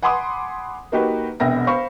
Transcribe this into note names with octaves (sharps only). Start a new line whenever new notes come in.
F#5 G#5 B5 C6 D6 D#6
A#3 D#4 F#4 G4 B4
E1 C2 B3 E5 G5 A#6
C5 F5 B5 C#6